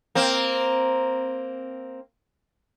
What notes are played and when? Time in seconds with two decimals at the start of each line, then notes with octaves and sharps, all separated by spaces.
0.15 A#3 C4